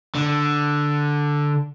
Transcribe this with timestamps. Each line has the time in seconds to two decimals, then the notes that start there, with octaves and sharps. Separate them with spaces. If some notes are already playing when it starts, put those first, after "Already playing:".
0.15 D3